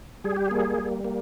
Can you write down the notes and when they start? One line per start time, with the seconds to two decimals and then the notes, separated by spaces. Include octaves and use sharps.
0.24 G3 G#4
0.36 G4
0.48 A#3 G#4
0.78 G3
1.05 A#3